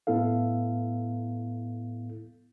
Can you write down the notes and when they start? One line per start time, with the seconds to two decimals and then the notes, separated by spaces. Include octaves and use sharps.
0.07 A2 B3 E4 A4 F5